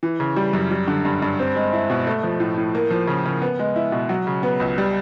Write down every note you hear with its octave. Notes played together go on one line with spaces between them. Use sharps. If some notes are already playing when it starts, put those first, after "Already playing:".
E3
C#3
G3
F#2
G3
D3
G2
G2
C4
G#3
E4
B2
A3
F3
A2
A2
A#3
F3
C#3
C#3
B3
G#3
E4
B2
F#3
C#3
B3
C#2
G3